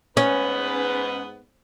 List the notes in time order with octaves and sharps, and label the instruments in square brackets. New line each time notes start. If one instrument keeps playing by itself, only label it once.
[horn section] G#2 B3 B4 [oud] C#4